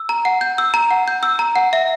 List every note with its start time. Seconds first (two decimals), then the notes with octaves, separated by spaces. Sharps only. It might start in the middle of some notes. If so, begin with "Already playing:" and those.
Already playing: E6
0.09 A#5
0.25 F#5
0.41 G6
0.58 E6
0.74 A#5
0.91 F#5
1.08 G6
1.23 E6
1.39 A#5
1.56 F#5
1.73 E5